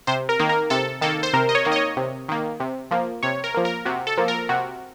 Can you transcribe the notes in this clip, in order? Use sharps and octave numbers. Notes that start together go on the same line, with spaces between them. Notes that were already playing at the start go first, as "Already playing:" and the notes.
C3 C5
A#4
D#3 A#3
A#4
C3 A4
D#3 A#3 A4
C5
C3 A#4
D#5
C#5
D#3 A#3
D#5
C#5
C3
D#3 A#3
C3
F3 A#3
C3 C#5
A#4
F3 A#3
A#4
C3 F#4
A4
F3 A#3
A#4
C3 F#4